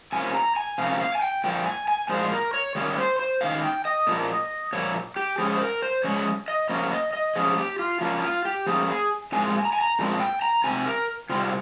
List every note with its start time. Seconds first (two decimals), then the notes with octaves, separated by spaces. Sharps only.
0.12 C3 F3 A#3 C#4 G#5
0.34 A#5
0.56 G#5
0.78 C3 F3 A#3 C#4 F5
1.00 F5
1.15 G#5
1.22 G5
1.44 A#2 F3 G5
1.66 G#5
1.88 G#5
2.09 A#2 F3 G#3 C5
2.32 A#4
2.54 C#5
2.75 D#3 G3 A#3 C#4 C#5
2.98 C5
3.19 C5
3.41 D#3 G3 A#3 C#4 F5
3.63 G5
3.85 D#5
4.07 A#2 F3 A#3
4.73 A#2 F3 A#3 C#5
5.16 G4
5.38 F3 G#3 C#4 G#4
5.55 C5
5.60 A#4
5.82 C5
6.04 F3 G#3 C#4 C#5
6.48 D#5
6.69 F3 A#3 C#4 C#5
6.91 D#5
7.13 D#5
7.36 F3 A#3 C#4 G#4
7.58 G4
7.79 F4
8.01 F3 A#3 C#4 F4
8.22 F4
8.45 G4
8.66 F3 A#3 C#4 G#4
8.88 G#4
9.32 A#2 F3 G#3 C4 G#5
9.65 A#5
9.73 G#5
9.81 A#5
9.99 A#2 F3 G#3 C4
10.20 G5
10.42 A#5
10.64 C3 G3 C4 G#5
10.86 A#4
11.30 C3 G3 C4 F4